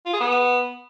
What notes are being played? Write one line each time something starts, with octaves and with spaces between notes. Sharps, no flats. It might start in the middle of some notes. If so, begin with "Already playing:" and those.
F4
G#4
B3